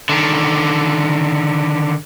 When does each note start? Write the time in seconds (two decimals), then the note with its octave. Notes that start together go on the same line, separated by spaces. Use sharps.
0.09 D3 D#3